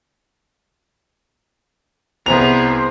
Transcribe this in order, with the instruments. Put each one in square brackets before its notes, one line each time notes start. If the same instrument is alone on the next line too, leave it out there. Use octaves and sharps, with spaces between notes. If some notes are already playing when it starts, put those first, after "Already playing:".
[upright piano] C2 A#5 F7 [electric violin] B3 G#4 [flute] C5